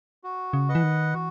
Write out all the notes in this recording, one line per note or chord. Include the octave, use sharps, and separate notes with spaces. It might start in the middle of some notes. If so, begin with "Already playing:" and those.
F#4
C#3
B4 D#5 F#5
E3
D#3
E3 F#4